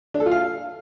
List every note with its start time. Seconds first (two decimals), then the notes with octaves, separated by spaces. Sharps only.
0.14 D4
0.20 A4
0.26 F4
0.31 F5